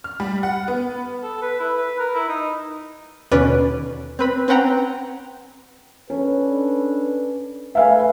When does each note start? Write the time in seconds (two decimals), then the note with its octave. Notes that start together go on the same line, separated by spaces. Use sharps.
0.04 F6
0.20 G3
0.43 F#5
0.68 B3
1.23 A4
1.42 B4
1.60 E4
1.77 B4
1.99 A#4
2.15 E4
2.29 D#4
3.31 D#2 B2 D3 C#4 B4 D5
4.19 C4 B4 B5
4.48 C4 C#4 B4 F#5 G5 A#5
6.10 C#4 D4 A4 B4
7.75 A3 A4 B4 E5 F5 G#5